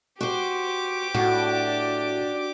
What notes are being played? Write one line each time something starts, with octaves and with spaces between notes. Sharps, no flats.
F#4 G4 C5 D6
A2 D4 F#4